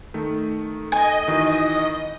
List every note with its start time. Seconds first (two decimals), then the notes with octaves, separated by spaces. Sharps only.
0.14 D#3 A3
0.92 D#5 G#5
1.28 D#3 E3 F#4